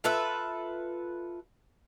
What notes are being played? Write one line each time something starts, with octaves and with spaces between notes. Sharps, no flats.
F4 A4 B4 E5